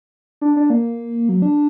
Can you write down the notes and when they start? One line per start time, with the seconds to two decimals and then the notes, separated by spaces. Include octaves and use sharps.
0.41 D4
0.56 D4
0.70 A#3
1.29 F#3
1.42 D4